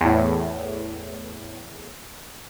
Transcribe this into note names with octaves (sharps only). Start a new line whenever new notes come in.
E2 A2